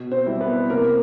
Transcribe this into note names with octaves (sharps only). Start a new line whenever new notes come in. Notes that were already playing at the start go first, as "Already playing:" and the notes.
Already playing: B2
C4 C5
G3 C4 E4
B3 B4
C3 A#3 A#4